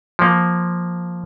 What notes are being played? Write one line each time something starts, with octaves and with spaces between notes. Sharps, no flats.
F3 A#3